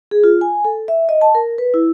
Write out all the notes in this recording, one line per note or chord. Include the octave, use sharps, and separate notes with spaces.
G#4
F4
G#5
A4
E5
D#5
A5
A#4
B4
E4